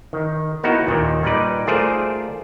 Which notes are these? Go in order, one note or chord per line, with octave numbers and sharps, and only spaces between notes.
D#3
A#3 B3 D#4 E4 F#4 G5
D#2 A#2 D#3
A#2 G3 D#4 B4 D5
A3 F4 G#4 A#4 C5 D5